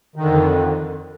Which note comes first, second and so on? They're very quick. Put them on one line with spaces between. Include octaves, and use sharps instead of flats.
D#3 D3 F2